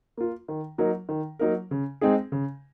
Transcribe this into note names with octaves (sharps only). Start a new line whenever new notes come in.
A#3 F4
D#3
F#3 A#3 D#4 A#4
D#3
F#3 A#3 D#4 A#4
C#3
G#3 C4 D#4 G#4
C#3